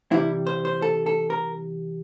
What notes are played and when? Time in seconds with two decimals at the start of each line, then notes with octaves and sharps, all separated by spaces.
0.12 C3 E3 G3 E4
0.47 C5
0.65 C5
0.82 A4
1.06 A4
1.30 A#4